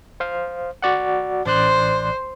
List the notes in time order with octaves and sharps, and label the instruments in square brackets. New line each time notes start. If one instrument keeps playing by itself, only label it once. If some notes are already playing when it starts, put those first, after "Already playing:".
[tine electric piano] C5 F5
F#4 D5 F#5
[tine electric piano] A1 D5 F#6 [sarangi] C5